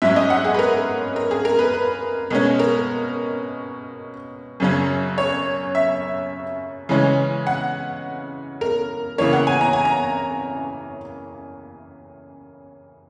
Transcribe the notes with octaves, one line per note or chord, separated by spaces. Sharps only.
G#2 F#3 C#4 E5
D#5
F#5
G#4
B4
A#4
A#4
G#4
A#4
B4
B4
B2 G#3 C#4 A#4
A#4
F#2 C#3 F#3 C#4
C#5
E5
C#3 E3 G#3 C#4
F#5
A#4
C#3 E3 A#3 C#5
F#5
G#5
A#5
G#5
A#5